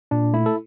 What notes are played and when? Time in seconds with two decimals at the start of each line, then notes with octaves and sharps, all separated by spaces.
0.11 A#2 D4
0.33 A3 E4
0.46 A4